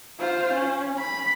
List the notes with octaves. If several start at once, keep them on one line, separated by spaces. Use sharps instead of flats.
F4 C5
C#4
B5